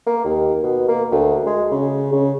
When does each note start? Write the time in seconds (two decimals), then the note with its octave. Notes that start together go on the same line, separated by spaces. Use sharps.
0.06 A#3
0.25 D#2
0.63 B2
0.88 A#3
1.11 D2
1.47 G#3
1.72 C#3
2.12 C#3